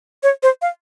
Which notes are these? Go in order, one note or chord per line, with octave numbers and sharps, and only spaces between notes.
C#5
C5
F5